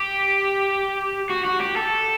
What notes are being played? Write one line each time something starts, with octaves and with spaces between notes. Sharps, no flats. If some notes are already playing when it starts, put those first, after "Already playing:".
Already playing: G4
F#4
F#4
G4
A4